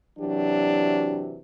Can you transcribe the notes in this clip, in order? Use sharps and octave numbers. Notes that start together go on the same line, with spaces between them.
C3 E3 F#3 D4 F#4 G4